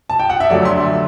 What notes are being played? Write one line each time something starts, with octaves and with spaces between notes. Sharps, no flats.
A5
G5
F#5
E5
D2 D3 F#3 A3 D5
C6
E5